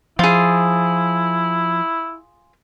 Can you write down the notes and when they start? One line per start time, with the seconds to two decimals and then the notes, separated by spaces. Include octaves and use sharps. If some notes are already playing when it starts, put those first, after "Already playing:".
0.19 F3 E4 F4 G#4